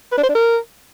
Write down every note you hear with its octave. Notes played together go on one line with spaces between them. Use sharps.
B4
D4
C5
D4
A#4